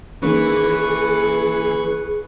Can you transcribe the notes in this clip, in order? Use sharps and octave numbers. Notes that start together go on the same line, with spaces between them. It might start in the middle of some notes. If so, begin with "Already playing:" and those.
D#3 E3 A#3 C#4 G#4 B4 C#6